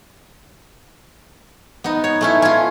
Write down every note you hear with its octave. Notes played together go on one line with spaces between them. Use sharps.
B3 D#4
C#5
A3 C#4 E4
C#4 F4